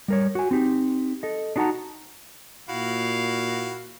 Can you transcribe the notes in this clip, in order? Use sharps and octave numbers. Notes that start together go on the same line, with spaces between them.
G3 A#4 C#5
F#4 G#5
C4 D#4 G4
A4 D#5
D4 D#4 F#4 F#5 A5 A#5
A#2 E4 F#4 F5